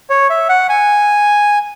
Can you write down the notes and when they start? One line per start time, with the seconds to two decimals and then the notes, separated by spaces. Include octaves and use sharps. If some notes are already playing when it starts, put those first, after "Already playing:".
0.10 C#5
0.30 E5
0.49 F#5
0.69 G#5